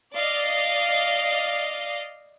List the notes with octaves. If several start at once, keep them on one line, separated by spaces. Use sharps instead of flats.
D5 D#5 F5